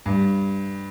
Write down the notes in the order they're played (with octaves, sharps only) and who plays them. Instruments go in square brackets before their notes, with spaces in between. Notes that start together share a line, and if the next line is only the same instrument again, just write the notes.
[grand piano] G2